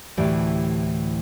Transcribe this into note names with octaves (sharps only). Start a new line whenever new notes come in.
D2 A2 E3 G4 D5